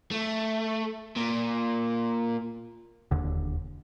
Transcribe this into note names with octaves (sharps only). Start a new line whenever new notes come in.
A3
A#2
E1 D#2 D3